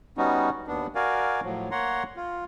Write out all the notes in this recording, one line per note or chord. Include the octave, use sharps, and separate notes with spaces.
G3 B3 C#4 D#4 F#4
D#2 B3 D4
F#4 A#4 D5 F5 G#5
A2 F3 F#3
A#3 C#5 F#5 A#5 C6
F4